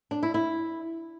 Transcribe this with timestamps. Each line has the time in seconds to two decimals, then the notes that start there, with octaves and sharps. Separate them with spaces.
0.11 D4
0.23 E4
0.34 E4